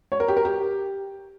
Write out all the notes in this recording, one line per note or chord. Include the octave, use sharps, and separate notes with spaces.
C#5
A#4
G4
A#4
G4